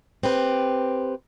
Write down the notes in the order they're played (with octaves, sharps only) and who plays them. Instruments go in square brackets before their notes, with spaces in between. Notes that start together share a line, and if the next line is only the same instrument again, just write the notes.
[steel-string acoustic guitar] C4 G4 B4